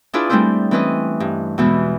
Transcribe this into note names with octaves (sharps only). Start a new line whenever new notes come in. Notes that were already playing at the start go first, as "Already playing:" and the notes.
D4 E4 F4 G#4 B4 D5
G3 A3 C4 D4 E4 C5
E3 C4 C#4 B4 D#5
G2
E2 B2 E3 G#3